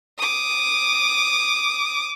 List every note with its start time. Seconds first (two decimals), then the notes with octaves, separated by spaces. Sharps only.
0.18 D6 D#6